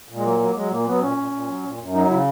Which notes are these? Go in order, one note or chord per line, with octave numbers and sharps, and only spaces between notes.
A#2
G#3
F#3 A#3
F#3
F#3 G#3
A#2 A#3
F#3 B3
A#2 C#4
A#2
A#2
F#3
A#2
F#2
F#3 D#4
C#3 E4